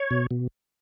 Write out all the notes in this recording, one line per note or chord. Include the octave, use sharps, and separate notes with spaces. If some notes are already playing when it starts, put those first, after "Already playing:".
Already playing: C#5
B2
B2